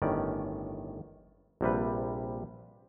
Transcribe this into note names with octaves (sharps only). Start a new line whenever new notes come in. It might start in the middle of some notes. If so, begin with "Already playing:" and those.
G1 A2 D#3 C#4 D5
A#1 C3 G3 B4